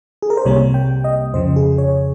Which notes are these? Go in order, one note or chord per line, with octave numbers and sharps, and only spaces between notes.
G#4
A#4
C5
C2 C3 G3 A#3 C#5
G5
D#5
F2 C#3 F3 C5
G#4
C#5